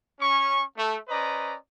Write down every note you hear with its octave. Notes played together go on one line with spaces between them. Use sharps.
C#4 G#5 C#6
A3
C#4 B4 C5 D5 D#5 A#5